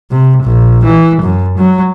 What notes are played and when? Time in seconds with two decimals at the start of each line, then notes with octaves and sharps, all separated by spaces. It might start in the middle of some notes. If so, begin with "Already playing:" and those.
0.11 C3
0.43 A#1
0.84 E3
1.22 F#2
1.58 F#3